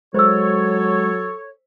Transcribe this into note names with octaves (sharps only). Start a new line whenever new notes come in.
F#3 G#3 A4 C5 C#5 E6